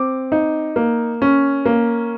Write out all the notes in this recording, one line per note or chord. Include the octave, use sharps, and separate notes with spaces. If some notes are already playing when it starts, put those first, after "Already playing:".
Already playing: C4 D6
D#4
A#3
C#4
A#3